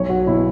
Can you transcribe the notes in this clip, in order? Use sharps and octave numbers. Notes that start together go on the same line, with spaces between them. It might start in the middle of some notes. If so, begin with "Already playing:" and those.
Already playing: B1 C#5
F#4
B2 F#3 E4